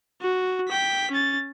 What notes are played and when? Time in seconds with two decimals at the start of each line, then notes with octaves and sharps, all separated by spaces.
0.22 F#4
0.68 G5 B6
1.11 C#4 A6